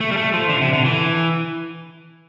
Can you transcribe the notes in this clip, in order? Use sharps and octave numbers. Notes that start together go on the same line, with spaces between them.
A3
G3
A3
F3
D3
C3
D3
E3